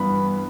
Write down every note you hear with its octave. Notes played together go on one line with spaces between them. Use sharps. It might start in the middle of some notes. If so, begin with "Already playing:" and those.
Already playing: G2 E3 B3 B5